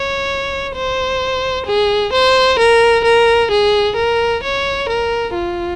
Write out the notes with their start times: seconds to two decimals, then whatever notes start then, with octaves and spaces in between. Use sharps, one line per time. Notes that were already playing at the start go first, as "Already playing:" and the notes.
Already playing: C#5
0.76 C5
1.67 G#4
2.13 C5
2.59 A#4
3.04 A#4
3.51 G#4
3.97 A#4
4.43 C#5
4.89 A#4
5.35 F4